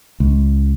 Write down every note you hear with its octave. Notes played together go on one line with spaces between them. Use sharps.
C#2